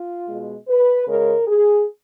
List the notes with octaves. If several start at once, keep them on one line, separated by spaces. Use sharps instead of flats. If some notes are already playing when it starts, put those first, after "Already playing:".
Already playing: F4
B2 G#3
B4
C#3 G#3 A#4
G#4